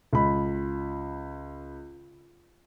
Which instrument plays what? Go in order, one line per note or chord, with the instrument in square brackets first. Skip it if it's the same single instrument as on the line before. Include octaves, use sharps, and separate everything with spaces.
[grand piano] C#2 B5